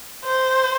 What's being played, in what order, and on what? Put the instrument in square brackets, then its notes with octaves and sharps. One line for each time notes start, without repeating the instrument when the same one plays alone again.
[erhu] C5